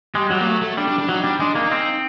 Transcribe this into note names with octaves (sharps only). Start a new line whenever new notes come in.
G3 G#3
F#3 G3
A#3
A3
A3
G3 D4
D4
D4
F#3 D#4
G3 D4
G#3 D4
A#3 D#4
C4